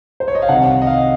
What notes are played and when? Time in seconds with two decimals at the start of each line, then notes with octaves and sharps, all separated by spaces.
0.20 C5
0.28 C#5
0.35 D#5
0.42 F5
0.49 C2 C3 D#3 F#5
0.82 D#5
0.87 F5